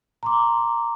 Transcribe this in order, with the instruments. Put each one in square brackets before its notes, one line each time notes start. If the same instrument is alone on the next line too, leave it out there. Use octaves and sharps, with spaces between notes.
[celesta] A#5 C6 D6